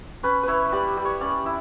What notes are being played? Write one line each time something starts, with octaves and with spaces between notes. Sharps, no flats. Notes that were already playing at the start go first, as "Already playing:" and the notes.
C#4 B4
E4 B4 C#5
G3 D5
G3
C#5
C#4 D5
E4